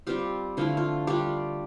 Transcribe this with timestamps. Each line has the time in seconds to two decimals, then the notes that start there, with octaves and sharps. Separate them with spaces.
0.07 G3 C4 F4 G4
0.57 D3 F3 A3 E4 F4
0.77 F4
1.07 G3 D4 F4 G4